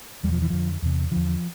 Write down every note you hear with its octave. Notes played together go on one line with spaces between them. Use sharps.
E2 G3
B2 F3
E3
F2 D3 F3
E2 C3
E2 D3 F3